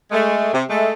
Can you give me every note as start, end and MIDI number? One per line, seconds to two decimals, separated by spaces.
0.11 0.52 56
0.11 0.52 57
0.53 0.63 48
0.69 0.93 56
0.69 0.93 57